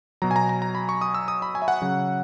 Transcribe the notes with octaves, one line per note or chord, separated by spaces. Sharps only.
B2 F#3 A#5
G#5
A#5
A#5
A#5
B5
C#6
D#6
E6
D#6
B5
G#5
E5
F#5
C#3 F#3